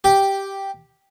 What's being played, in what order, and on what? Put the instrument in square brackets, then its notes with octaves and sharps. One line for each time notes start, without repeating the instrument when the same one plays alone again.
[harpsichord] G4